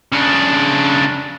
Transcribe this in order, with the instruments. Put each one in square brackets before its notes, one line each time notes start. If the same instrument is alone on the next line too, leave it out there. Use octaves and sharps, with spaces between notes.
[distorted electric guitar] C#3 D4